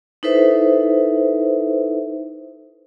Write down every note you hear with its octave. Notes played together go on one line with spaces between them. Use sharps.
D#4 E4 A4 B4 C5 E5